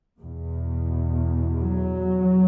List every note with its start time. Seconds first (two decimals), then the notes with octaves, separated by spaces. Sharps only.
0.19 E2 B2
1.60 F#3